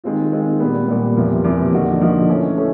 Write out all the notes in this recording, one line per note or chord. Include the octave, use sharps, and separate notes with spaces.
D#3 G#3 C4 F4
D#3 G#3 C4 F4
A#2 G3 B3
A#2 G3 B3
E2 C3 F3 A#3
E2 C3 F3 A#3
D3 F3 A#3 D#4 F#4
D3 F3 A#3 D#4 F#4
E3 A3 C#4
E3 A3 C#4